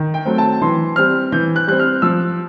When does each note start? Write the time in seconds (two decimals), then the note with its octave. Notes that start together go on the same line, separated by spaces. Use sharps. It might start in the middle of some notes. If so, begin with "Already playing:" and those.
Already playing: D#3
0.14 G5
0.25 F#3 A3 C4
0.38 A5
0.61 E3 C6
0.96 G3 C4 F6
1.32 E3 G6
1.56 F#6
1.67 G3 C4 F#6
1.79 F6
2.02 F3 E6